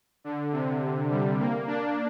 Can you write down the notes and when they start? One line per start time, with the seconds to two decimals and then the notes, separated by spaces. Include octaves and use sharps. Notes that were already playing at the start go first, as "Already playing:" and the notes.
0.24 D3
0.52 C3
1.11 G3
1.39 A#3
1.67 D4